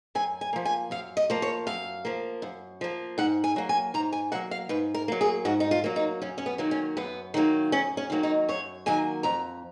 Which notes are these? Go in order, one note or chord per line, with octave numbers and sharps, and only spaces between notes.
F#2 G#5
G#5
F3 A#3
G#5
F#2 F5
D#5
F3 A#3
C#5
F#2 F5
F3 A#3
F#2
F3 A#3
G#2 F#5
G#5
F#3 A#3
G#5
G#2 A#5
G#5
F#3 A#3 F#5
F5
G#2 B4
A#4
F#3 A#3
G#4
G#2 F#4
D#4
F4
F#3 A#3
D#4
F#2 C#4
C#4
B3
D#3 F#3 A#3
C#4
F#2 B3
D#3 F#3 A#3
F#2 C#4
C#4
D#3 F#3 A#3
D#4
F#2 C#5
D#3 F#3 A#3 G#5
F2 A#5